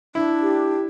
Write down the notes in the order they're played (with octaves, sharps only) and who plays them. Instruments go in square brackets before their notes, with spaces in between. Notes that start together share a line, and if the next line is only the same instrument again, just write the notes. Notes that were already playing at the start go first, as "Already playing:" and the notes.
[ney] D4 [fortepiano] E4
[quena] G4